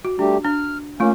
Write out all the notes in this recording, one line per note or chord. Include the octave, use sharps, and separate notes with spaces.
F#4
G3 A3 D4 G4
D4 F6
A3 A#3 C#4 F4